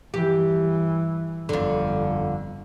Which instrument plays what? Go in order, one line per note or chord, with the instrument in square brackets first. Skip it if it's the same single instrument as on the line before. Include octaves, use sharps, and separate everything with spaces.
[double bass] G2 E3 [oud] G4
[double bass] G1 [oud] F2 D3